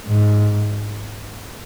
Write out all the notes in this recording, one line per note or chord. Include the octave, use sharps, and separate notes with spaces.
G#2